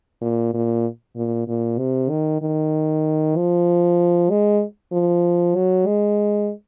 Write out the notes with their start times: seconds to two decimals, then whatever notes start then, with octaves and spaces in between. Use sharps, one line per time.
0.21 A#2
0.54 A#2
1.16 A#2
1.48 A#2
1.79 C3
2.10 D#3
2.42 D#3
3.36 F3
4.30 G#3
4.93 F3
5.56 F#3
5.87 G#3